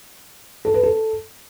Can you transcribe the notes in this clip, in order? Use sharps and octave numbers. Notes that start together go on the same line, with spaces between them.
A4
B4
A4